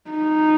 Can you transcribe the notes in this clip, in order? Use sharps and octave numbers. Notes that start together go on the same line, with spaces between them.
D#4